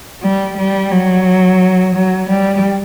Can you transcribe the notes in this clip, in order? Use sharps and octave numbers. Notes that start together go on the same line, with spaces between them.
G3
G3
F#3
F#3
G3